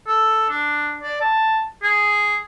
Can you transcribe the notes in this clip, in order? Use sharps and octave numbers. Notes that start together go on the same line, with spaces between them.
A4
D4
D5
A5
G#4